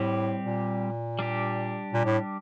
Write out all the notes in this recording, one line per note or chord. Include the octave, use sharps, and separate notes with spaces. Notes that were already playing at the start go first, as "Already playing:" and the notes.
Already playing: A2 G3 C4 G4
A#2
G3 D4 G4
A#2
A2